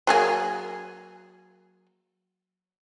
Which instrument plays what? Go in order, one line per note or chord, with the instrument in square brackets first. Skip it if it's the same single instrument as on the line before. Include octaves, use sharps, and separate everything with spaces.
[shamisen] F#3 A#3 G#4